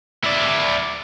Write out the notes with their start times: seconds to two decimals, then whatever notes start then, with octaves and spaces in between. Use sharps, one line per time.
0.24 E4 D5